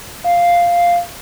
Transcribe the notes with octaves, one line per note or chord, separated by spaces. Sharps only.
F5